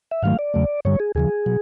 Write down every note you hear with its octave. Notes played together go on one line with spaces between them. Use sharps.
E5
G#2 D#3 F#3 A3 F5
D5
E2 C#3 F#3 A3
G2 D3 G3 C#5
G#4
D#2 C#3 F3 G#4
B2 F#3